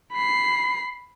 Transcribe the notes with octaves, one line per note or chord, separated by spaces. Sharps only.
B5 C7